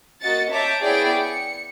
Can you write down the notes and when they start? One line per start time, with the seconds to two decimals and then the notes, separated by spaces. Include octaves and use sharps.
0.22 A#3 F#4 D#5 A6 C#7
0.51 C#5 E5 A5 A#5 D6 G6
0.82 B3 E4 G#4 C#5 D5 G5
1.23 C#7